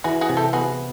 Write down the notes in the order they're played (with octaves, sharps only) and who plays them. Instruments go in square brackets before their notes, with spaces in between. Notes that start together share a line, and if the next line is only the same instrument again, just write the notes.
[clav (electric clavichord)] E3 [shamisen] F#4 G#4
[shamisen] F#4 G#4
[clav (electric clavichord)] C3
[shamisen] G4 A4
[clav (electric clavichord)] B3 [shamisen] F#4 G#4